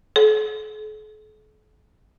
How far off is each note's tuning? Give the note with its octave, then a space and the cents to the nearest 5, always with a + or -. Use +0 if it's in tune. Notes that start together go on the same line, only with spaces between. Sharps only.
A4 -45